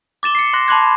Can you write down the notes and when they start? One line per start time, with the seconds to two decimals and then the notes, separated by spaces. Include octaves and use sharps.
0.23 D6 A6 E7 G7
0.35 C7 C#7
0.53 C6 F#6 A#6
0.68 A5 B5 C6 D6 F#6 G#6